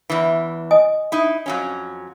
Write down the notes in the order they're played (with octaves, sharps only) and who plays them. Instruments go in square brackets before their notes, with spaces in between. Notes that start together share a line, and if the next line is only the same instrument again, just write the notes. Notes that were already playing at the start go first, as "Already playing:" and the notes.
[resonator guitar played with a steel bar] E2 E3
[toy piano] D#5 G#5 D#6
[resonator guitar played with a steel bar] D#4 E4
F2 F#3 C#4